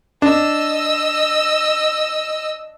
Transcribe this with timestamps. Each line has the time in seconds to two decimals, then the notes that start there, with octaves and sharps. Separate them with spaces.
0.22 D4 D#5 E6